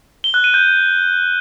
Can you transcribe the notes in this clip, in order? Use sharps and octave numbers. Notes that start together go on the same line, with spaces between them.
G7
F#6
D#7
G6